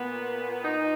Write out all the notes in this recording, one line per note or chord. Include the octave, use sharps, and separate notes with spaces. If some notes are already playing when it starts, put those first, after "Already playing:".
Already playing: A#2 B3
D#4